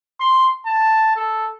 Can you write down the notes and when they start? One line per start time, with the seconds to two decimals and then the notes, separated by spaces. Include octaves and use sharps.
0.20 C6
0.66 A5
1.16 A4